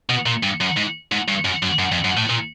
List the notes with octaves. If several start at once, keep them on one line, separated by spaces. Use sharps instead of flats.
B2
A#2
G2
F#2
G#2
G#2
G2
F#2
F#2
F#2
F2
F#2
A2
A#2